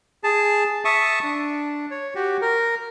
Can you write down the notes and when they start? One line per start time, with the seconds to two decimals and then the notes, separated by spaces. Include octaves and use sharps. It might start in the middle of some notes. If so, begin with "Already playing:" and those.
0.24 G#4 A5
0.85 E5 A5 C#6 D#6
1.23 D4
1.91 C#5
2.15 F#4 G4
2.42 A#4